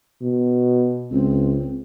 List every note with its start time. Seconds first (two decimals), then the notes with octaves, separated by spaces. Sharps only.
0.22 B2
1.11 C#2 C4